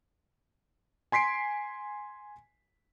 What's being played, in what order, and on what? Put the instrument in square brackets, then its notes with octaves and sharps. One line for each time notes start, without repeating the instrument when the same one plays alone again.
[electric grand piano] G#5 C6 B6 C7 D7